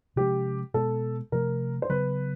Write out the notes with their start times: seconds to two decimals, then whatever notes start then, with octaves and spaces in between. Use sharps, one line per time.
0.16 C3 F3 G#3 C#4 G4
0.74 B2 G#3 B3 A4
1.32 C3 F3 A3 A#4
1.82 C5
1.90 C#3 F#3 B3 B4